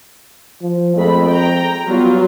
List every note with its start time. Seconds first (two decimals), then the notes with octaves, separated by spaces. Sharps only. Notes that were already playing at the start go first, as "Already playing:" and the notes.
0.62 F3
0.97 F2 G#3 A3 B5
1.29 G5 A#5
1.88 F#3 G3 B3 F4